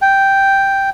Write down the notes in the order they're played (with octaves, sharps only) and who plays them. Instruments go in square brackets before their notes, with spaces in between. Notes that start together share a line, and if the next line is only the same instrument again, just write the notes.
[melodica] G5